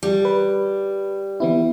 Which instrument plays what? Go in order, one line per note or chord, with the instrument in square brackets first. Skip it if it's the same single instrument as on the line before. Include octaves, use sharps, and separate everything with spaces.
[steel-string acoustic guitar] G3
[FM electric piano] B4
E3 B3 E4